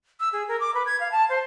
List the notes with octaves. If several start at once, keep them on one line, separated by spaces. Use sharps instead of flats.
E6
G#4
A#4
D6
B4
G#6
F5
A5
C5